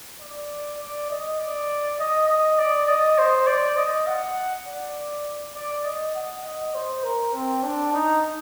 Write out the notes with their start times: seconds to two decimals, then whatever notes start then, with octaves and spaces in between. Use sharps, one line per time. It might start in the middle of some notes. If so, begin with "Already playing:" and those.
0.21 D5
0.80 D5
1.10 D#5
1.39 D5
1.99 D#5
2.29 D#5
2.59 D5
2.88 D#5
3.18 C5
3.47 D5
3.77 D#5
4.07 F#5
4.66 D5
5.55 D5
5.85 D#5
6.15 F#5
6.44 D#5
6.74 C5
7.04 A#4
7.34 C4
7.63 D4
7.93 D#4